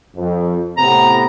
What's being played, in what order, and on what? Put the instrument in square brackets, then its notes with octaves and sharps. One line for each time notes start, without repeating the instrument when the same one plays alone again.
[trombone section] F2
[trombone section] A2 C3 B3 [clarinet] A#5